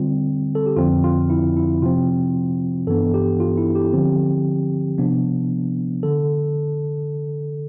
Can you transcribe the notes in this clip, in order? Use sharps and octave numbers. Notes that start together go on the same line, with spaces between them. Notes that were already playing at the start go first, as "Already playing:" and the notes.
Already playing: D3 G3 C4 F4
A4
G4
F2 D3 F3 C4 F4
F4
E4
E4
C3 F3 C4 F4
G2 E3 B3 D4 A4
G4
F4
E4
G4
D3 F3 C4
C3 F3 B3 D4
D3 A4